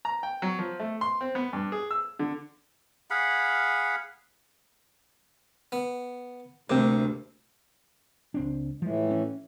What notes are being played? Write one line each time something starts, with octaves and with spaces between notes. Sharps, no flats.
A#5
G5
F#3
F3
A3
C6
C4
B3
G2
G#4
E6
D3
G#4 F5 F#5 B5
B3
D2 C3 A#3 C4
C#2 C4 D4
A2 E3 F3 G#3
C#4